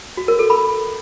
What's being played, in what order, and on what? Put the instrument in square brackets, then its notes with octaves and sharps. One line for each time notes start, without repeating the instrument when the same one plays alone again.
[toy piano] F#4
A#4
A4
B5